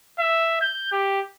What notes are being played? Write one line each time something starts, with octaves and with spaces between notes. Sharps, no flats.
E5
G6
G4